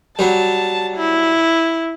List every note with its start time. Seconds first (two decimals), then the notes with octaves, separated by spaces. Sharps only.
0.19 F#3 G3 A5
0.98 E4